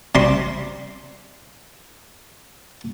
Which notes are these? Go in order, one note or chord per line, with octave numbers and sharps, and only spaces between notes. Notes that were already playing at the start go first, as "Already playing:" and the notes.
C3 G3 C6